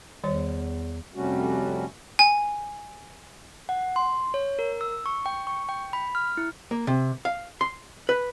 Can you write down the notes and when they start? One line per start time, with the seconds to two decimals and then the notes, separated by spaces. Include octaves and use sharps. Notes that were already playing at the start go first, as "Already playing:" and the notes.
0.24 E2 D#3 G3 C#5
1.14 F2 C3 G3 A3 C#4 F#4
2.19 G#5
3.69 F#5
3.96 C6
4.34 C#5
4.59 A#4
4.81 E6
5.06 C#6
5.26 G5
5.47 C#6
5.69 G5
5.93 B5
6.15 F6
6.37 E4
6.71 A#3
6.87 C3
7.25 F5
7.61 C6
8.09 B4